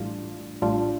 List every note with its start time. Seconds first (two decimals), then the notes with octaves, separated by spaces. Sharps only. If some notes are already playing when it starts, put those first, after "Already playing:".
Already playing: A1 A2 G3 D4 F4
0.62 A1 A2 G3 D4 F4